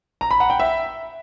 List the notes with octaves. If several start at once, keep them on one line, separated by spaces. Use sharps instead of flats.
A#5
B5
F#5
G5
E5